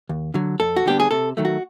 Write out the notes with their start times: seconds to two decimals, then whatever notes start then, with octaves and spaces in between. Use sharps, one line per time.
0.09 D#2
0.34 D3 F#3
0.60 F2 A4
0.76 F#4
0.86 D3 G3 B3 D4 G4
1.00 G#4
1.11 C3 A4
1.37 D#3 F#3 A3
1.45 F#4